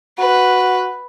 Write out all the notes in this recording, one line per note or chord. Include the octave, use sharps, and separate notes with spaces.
F#4 B4